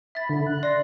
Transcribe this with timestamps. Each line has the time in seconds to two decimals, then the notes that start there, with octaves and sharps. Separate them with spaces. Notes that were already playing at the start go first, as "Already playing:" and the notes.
0.15 E5 B5 A6
0.29 D3
0.47 F#6
0.63 D5 C6 A#6